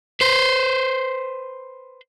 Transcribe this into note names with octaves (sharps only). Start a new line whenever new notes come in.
B4 C5